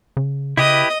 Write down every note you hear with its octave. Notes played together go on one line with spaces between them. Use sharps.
C#3
C#3 E4 G4 B4 D#5